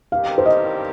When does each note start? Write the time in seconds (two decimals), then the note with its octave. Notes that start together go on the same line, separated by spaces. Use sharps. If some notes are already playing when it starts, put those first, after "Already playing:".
0.12 G2 D#3 C4 G4 A#4 F5
0.38 C5
0.45 D#5